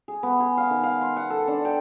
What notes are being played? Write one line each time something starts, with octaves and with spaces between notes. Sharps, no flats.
G#4
B3
G#4
F5
D#3
F5
C6
F#5
A4
D4
G5